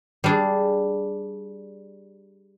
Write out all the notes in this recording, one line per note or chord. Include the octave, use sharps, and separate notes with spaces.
G3 D4 G#4